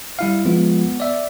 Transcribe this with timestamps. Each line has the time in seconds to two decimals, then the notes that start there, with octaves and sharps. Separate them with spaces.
0.19 G3 E4 F5
0.45 F3 G#3 B3 F4
1.00 D5 E5